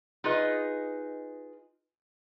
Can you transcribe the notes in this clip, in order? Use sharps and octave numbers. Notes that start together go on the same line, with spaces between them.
D#4 F4 G#4 B4 D#5